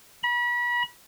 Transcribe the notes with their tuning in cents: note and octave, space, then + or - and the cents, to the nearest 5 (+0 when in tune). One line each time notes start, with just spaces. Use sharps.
B5 -35